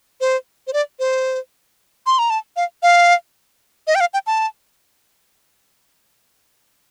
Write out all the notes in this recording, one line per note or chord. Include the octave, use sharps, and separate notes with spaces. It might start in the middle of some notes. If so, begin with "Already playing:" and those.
C5
C5
D5
C5
C6
A#5
A5
F5
F5
D#5
G5
F5
G5
A5